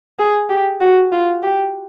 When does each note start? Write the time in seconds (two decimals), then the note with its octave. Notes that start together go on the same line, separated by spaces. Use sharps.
0.19 G#4
0.50 G4
0.81 F#4
1.12 F4
1.43 G4